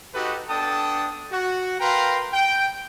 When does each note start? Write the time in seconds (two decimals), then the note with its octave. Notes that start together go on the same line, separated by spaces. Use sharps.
0.14 D#4 F#4 G4 A4 B4 D#5
0.49 B3 D4 A4 G5 A5 D#6
1.32 F#4
1.80 A#4 B4 F5 G5 A#5 C6
2.32 G5